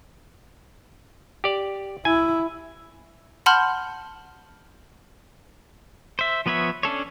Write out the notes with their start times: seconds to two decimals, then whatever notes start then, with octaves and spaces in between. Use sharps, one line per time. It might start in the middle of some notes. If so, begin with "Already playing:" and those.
1.44 G4 D5
2.05 E4 G#5
3.46 F#5 A5 B5 C6 F6 G6
6.19 C5 E5
6.46 F3 B3 B4 C#5 E5
6.83 C#4 D4 A4 C#5